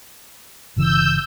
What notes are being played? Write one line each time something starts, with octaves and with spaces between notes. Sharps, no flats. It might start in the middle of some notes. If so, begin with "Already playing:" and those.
G1 C#3 E3 E6 G6